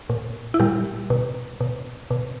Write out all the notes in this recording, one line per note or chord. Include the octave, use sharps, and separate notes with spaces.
A#2
E4
A#2 G3 G4
B2
B2
B2